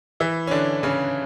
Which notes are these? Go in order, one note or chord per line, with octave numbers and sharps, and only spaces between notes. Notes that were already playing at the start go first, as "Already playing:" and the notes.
E3 E4
C#4
D3 D4
C#3 C#4